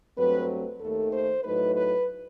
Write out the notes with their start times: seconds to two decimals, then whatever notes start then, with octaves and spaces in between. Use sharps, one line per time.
0.17 G2 F#3 A3 C4 B4
0.81 D#2 D#3 A3 A4
1.13 C5
1.44 A2 F#3 A3 D#4 B4
1.76 B4